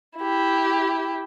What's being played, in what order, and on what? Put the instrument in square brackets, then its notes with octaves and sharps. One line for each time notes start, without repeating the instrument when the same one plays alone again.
[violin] E4 G4